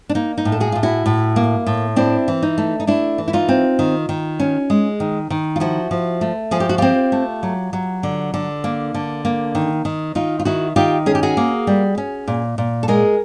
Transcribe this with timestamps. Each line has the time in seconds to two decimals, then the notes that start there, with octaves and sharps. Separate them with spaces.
0.09 D4
0.15 A#3 D#4
0.38 D#4
0.45 A2
0.52 A4
0.60 F#4 G#4
0.72 A2 F4
0.83 E4 F#4
1.06 A2
1.36 A#3
1.67 A2
1.96 C4 D4 E4
2.28 E3
2.43 D#4
2.58 A3
2.80 D#4
2.87 A3 D4 E4
3.18 E3
3.28 E4
3.33 D#4 F4
3.49 C4
3.79 D#3
4.09 D#3
4.40 C#4
4.70 G#3
5.00 D#3
5.30 D#3
5.56 F4
5.60 F3 E4 F#4
5.91 F3
6.21 A3
6.51 F3 G#4
6.60 G4
6.69 F#4
6.78 C4 F4 G4
7.12 A3
7.43 F#3
7.73 F#3
8.03 D3
8.34 D3
8.64 A#3
8.94 D3
9.25 A#3
9.55 D#3
9.85 D#3
10.15 D#3 D#4 F4
10.40 F4
10.45 D#3 E4 F#4
10.76 D#3 F4 G4
11.06 C#4 G#4
11.15 G4
11.23 F#4 G#4
11.37 A#3
11.67 G3
11.98 C#4
12.28 A#2
12.58 A#2
12.83 A4
12.88 G#3 G#4 A#4